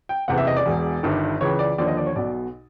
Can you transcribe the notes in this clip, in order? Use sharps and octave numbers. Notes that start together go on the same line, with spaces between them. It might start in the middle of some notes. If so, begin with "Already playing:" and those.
G5
F#1 E2 C3 E3 F#5
E5
D#5
D5
E1 E2 B2
G1 G2 D#3
C#2 C#3 E3 C#5
D5
D#2 D3 F3 D5
D#5
D5
C#5
B1 B2 D5